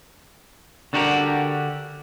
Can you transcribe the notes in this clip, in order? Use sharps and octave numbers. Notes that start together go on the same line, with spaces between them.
D3 D4 F#4 G4 A#4